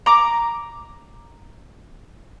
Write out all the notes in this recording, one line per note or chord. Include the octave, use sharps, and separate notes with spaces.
A#5 D6